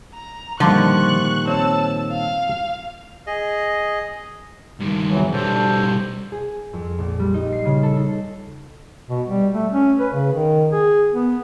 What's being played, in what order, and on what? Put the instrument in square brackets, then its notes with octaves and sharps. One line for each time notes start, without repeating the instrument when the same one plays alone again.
[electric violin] A#5
[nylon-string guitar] A#2 D#3 G3 [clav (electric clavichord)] D3 [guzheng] F3 [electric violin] C#6 F#6
[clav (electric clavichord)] C4 C#5 [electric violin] A5 E6
[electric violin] F5
[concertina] G#4 D#5
[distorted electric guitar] G2 D#3
[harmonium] E2 E3 F#3
[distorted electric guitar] B2 G3 [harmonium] D4 A4 C5
[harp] G#4
F2
A#1
G3
D#4
C7
C#3
A4
D#4
[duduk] B2
G3
A3
C#4
B4
C#3
D#3
G#4
B3